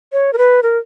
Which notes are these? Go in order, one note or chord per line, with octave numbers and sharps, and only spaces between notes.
C#5
A#4
B4
A#4